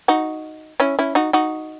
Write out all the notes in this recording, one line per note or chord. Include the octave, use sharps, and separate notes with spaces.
D#4 F#4
C#4 E4
C#4 E4
D#4 F#4
D#4 F#4